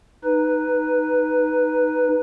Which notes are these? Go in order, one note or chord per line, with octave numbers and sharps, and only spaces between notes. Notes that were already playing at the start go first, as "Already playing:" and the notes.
D#4 B4